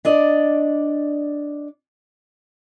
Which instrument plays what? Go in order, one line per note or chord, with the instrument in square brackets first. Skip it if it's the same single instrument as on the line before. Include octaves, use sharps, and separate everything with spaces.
[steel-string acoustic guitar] D4 D5 D#5